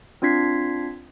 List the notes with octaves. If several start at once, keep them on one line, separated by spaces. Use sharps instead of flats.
C4 D4 F4 G#6 B6 C7